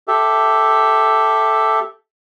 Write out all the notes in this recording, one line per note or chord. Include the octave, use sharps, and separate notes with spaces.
G4 A4 E5